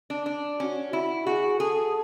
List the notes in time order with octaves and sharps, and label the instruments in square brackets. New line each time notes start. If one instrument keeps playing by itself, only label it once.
[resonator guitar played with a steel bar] D4
D4
[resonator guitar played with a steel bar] C#4 [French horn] F#4
[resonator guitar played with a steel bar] E4 [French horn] F#4
[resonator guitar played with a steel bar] F#4 [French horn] G#4
[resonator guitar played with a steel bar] G#4 [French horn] A4